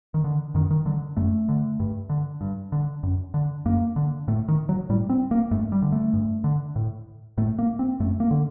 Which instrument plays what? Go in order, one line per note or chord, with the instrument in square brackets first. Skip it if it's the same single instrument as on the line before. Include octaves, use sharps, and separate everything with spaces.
[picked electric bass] D#3
D3
F#2 D#3
D#3
D3 F#3
F#2 A3
D3
G2
D3
G2
D3
F#2
D3
F#2 A#3
D3
A2 A3
D#3
F#3
A2 G3
C4
A#3
G2 A3
G3
D3
A3
G2
D3
A2
A2 A3
A#3
C4
F#2 A3
A#3
D3